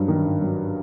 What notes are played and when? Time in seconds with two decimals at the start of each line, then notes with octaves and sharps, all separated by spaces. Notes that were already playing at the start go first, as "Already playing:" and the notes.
Already playing: G2 F#3
0.08 D#3
0.25 G#1
0.42 F#3